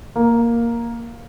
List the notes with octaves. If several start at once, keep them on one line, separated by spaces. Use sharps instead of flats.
A#3